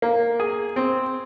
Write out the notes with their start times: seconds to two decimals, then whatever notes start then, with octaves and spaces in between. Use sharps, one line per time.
0.02 A#3
0.40 G#4
0.76 C4